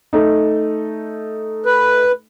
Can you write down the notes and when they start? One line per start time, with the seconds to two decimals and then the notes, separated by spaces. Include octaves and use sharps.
0.13 A3 D#4
1.66 B4